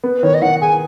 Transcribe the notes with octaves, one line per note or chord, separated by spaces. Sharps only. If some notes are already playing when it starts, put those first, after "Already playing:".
B3
B4
D#3 C#5
D#5
D#3 F#5
G#4 G#5